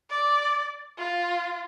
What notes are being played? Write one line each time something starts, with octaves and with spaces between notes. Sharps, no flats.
D5
F4